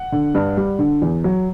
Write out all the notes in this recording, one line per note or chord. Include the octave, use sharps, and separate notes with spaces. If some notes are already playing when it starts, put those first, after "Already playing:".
Already playing: F#5
D3
G2
G3
D3
E2
F#3